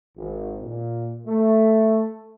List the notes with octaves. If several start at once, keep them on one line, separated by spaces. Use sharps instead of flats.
G#1
A#2
A3